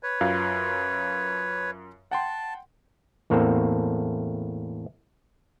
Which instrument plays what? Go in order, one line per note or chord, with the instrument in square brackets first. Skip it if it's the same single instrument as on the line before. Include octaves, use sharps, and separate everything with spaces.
[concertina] B4 C#5
[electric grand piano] F#2 F4 F5
[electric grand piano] F#5 G5 C6 [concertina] A5
[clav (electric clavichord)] E2 A2 A#3 C4 A4